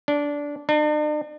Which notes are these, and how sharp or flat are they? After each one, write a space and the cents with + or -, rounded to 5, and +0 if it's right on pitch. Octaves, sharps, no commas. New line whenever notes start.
D4 -15
D4 +45